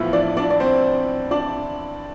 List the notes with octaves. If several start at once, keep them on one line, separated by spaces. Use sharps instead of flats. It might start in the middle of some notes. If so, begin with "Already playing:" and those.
Already playing: A1 A2 F3 B3 E4 F4 E5
D4 D5
D4 D5
D5
C4 C5
D4 D5